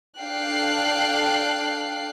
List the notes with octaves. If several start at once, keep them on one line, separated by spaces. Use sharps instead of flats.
D4 A4 F5 G5 F#6 C7